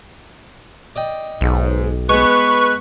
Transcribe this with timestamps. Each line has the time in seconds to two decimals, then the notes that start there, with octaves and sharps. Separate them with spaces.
0.96 D5 D#5 G5
1.41 B1 G#2
2.09 G#3 B3 B4 C#6